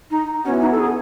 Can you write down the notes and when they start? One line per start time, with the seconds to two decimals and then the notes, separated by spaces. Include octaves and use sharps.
0.10 D#4
0.44 E3 B3 C#4 F#4
0.61 D#4
0.71 A4
0.79 G#4